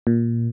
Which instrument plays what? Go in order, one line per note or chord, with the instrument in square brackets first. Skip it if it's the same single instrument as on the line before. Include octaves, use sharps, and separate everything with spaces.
[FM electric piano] A#2